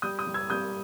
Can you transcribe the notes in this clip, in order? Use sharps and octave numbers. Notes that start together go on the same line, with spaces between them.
G3 D#6 G6
D#6 G6
G3
E6 G#6
G3 D#6 G6